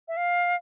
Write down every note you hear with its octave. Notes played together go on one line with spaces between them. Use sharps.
E5
F5